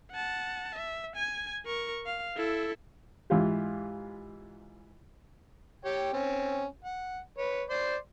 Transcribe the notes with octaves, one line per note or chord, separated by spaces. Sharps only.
F#5 A5
E5
G#5 G#6
A#4 C#6
F5
E4 A4
G#2 E3 F4 G4
G4 C#5 G5
C4 C#4
F#5
B4 C#5
C5 D5 C6